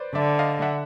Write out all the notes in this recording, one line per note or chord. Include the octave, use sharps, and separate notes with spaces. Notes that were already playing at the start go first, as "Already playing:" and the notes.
Already playing: B4 C5 D5
D3 D5 E5
D#5 F5
E5 F#5